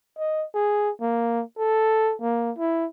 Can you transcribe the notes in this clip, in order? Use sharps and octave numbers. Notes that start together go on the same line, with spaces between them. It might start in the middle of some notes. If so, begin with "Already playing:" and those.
D#5
G#4
A#3
A4
A#3
E4